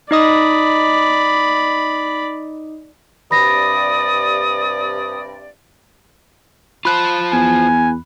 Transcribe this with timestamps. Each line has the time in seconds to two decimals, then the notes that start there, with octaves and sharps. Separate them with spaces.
0.11 D#4 D5 D#5 B5 D#6
3.31 G2 C3 D5 B5 D#6 A#6
6.85 F4 C5 A5 B5 F#6
7.32 E2 G#5